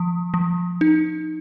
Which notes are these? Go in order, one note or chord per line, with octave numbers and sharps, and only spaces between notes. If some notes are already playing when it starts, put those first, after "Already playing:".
Already playing: F3
F3
D#4